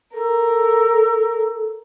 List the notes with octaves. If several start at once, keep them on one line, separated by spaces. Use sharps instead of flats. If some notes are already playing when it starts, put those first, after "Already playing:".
A4 A#4